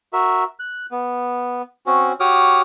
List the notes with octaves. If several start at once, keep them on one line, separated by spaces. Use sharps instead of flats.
F#4 A#4 E5
F#6
B3
C4 C#4 F#4
F#4 G4 C#5 D6 D#6 F6